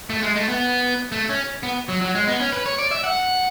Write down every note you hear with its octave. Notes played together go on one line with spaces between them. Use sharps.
A3
G#3
A3
B3
A3
C#4
B3
F#3
F#3
G#3
B3
C#4
B4
C#5
D5
E5
F#5